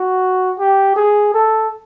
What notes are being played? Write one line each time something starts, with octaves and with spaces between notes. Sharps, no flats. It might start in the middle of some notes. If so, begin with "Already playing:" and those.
Already playing: F#4
G4
G#4
A4